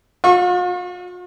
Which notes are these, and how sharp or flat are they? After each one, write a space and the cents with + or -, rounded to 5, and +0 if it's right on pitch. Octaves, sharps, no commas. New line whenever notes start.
F4 +45 C#6 -35